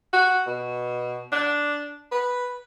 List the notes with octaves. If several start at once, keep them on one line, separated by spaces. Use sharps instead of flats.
F#4
B2
D4
B4